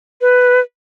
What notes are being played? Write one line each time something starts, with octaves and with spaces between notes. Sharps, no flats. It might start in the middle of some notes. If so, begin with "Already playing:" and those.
B4